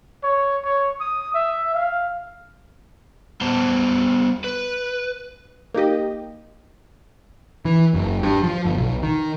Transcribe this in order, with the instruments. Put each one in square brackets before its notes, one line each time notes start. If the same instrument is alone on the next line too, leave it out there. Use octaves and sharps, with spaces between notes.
[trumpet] C#5
C#5
D#6
E5
F5
[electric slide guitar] G3 B3 C5 A5
B4
[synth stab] A#3 D#4 G4 D#5
[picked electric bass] E3
F#1
G2
F3
G1
B1
D#3